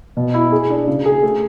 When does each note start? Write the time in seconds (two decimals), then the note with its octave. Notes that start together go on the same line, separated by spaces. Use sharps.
0.17 B2
0.34 E4
0.52 G#4
0.70 D4
0.87 C#3
1.05 G#4
1.23 A3